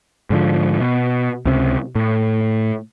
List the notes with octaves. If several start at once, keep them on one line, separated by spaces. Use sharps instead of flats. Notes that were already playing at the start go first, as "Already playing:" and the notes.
G#2 D3 F3
B2
C#2 C3
A2